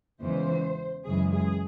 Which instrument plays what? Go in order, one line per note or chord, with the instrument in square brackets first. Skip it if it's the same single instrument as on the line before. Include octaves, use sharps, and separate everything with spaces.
[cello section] E2 C#3 E3 G#3 C5
F#2 C#3 E3 G#3 G#4
G#4